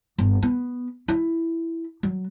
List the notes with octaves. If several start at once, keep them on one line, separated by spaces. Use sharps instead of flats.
G1
B3
E4
F#3